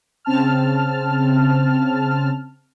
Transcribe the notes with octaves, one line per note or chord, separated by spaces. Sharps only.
C#3 C4 A5 F6